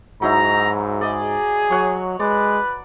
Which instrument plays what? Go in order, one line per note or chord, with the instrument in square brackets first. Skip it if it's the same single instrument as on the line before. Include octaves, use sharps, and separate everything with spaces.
[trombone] G#2 [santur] F#3 D#4 E4 [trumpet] A#5
[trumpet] G#4 [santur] D5 D#5
[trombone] F#3 [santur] C#5 F#5
[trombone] G#3 [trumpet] B4 [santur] D5